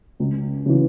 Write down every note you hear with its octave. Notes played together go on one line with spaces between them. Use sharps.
C#2
C#3 E3